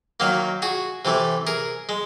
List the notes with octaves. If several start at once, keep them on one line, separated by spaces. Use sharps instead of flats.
D#3 F#3 A#3
F#4 G#4
C3 E3 A3
G#4 A#4
G#3